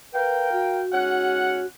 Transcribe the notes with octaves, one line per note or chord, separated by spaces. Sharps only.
A#4 B4 F5 G5
F#4
G#2 C#4 F#5